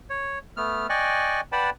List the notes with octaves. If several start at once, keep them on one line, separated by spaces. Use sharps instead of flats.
C#5
A3 B3 F6
D5 D#5 G5 G#5 C#6 F#6
B4 D5 F#5 G5 A5 B5